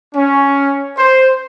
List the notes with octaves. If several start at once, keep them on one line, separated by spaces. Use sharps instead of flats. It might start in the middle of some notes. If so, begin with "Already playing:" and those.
C#4
C5